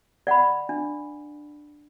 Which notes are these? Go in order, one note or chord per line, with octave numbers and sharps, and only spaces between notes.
D5 F#5 B5
D4